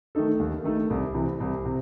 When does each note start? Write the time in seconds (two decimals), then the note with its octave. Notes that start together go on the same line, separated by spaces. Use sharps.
0.15 D#3 A3 D#4 A4
0.40 D#2
0.64 D#3 A3 D#4 A4
0.90 C2
1.14 C3 E3
1.40 C2
1.65 C3